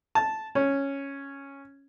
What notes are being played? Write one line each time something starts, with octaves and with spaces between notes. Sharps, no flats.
A5
C#4